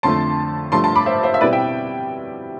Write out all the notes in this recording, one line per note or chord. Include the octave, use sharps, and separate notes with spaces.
F2 D3 F3 A3 A5 C6
G2 F3 A3 A5 C6
A5 C6
B5 D6
C5 E5
C5 E5
E5
B2 G3 C4 E4 B4 D5
E5 G5